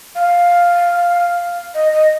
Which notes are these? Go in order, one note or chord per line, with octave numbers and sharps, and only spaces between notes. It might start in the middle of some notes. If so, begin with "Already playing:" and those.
F5
D#5
D#5